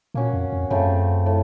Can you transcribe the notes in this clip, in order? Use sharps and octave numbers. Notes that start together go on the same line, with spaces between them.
A#2 A#3 C#4 F#4
F2
F2
F#2 C#3 A3 C4 F4
A2